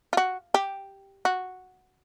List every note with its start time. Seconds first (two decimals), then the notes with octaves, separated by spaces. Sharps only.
0.13 F4
0.17 F#4
0.54 G4
1.25 F#4